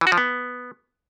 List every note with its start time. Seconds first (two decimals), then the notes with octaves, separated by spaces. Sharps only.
0.01 E3
0.07 F#4
0.12 F3
0.18 B3